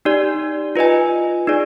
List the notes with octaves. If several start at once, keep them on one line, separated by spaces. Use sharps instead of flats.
D#4 G4 D5
F4 B4 D#5 G#5
D#4 G#4 D5